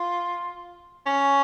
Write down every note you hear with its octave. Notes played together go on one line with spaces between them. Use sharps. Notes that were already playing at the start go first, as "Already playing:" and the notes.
Already playing: F4
C#4